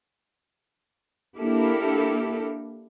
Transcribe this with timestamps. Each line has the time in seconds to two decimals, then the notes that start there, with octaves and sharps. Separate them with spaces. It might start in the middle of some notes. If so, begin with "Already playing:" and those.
1.37 A#3 D4 E4 G4 A4 A#4